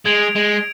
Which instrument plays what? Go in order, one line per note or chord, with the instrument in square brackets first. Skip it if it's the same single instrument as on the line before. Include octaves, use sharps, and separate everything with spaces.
[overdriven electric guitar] G#3 [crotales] G#6 D7 F7
[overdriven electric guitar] G#3